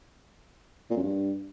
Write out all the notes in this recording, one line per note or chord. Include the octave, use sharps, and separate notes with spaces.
A#2
F#2
G2